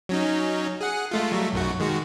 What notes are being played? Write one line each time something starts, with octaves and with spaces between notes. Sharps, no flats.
F#3 C#4 D#4
G#4 F#5
G#3 A3 F4
F#3 G3 A3
B1 F#2 F#4
D#3 G#3 F#4